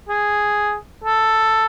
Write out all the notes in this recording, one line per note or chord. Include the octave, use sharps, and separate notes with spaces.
G#4
A4